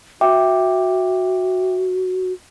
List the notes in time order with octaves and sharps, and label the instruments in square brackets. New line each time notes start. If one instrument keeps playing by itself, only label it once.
[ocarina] F#4 [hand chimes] E5 G5 D6